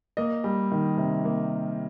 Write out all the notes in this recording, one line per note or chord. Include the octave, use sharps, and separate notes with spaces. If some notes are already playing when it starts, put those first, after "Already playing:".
A#3 D#5
G3
D#3
C3
A#3